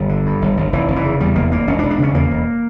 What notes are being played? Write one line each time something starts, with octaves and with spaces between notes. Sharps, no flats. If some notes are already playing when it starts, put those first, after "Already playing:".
Already playing: G1 G3
D3
G2
G1
G1
F1 E3
F1
E3
C#3
E2 G3
F1 A#3
F1 A#3
E1 C#4
D4
E1
D4
C#3 C#4
E2 A#3
E1